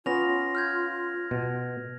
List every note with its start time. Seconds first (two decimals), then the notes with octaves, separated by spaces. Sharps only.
0.06 B3 C#4 F4 A#6 F7
0.55 F6 G6 G#6
1.31 B2